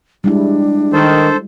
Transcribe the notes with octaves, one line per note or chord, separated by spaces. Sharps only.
G3 G#3 D4 E4
D#3 A4 C5